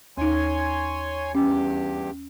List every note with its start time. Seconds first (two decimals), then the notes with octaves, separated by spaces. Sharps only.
0.18 D#2 D#4 C#5 G#5 C6
1.35 E2 G2 C#4 G4